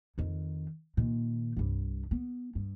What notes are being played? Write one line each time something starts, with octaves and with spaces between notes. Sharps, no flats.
F2 D#3
A#2 D#3
C2 G2
B3
G2